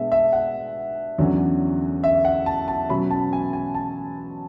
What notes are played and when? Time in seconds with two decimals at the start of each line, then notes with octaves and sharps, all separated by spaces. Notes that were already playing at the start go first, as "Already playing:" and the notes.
Already playing: B2 G#3 B3 D4 E5 A5
0.12 E5
0.33 F#5
1.18 E2 D3 F#3 C#4
2.04 E5
2.25 F#5
2.46 A5
2.68 A5
2.89 B2 F#3 C#4 B5
3.10 A5
3.33 G#5
3.53 G#5
3.74 A5